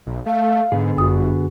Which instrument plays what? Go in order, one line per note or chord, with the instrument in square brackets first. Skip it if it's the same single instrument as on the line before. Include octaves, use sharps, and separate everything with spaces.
[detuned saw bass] B1
[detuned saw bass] A3 [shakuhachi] F5
[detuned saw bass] G#2 [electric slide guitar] D3 B3 G#4
[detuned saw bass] G1 [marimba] F#2 D#6 [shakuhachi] F#4